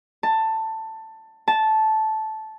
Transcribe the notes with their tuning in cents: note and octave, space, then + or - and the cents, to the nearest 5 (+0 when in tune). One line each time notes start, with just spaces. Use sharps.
A5 +15
A5 -10